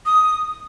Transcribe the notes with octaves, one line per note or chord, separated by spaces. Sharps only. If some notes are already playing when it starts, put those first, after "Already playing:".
D#6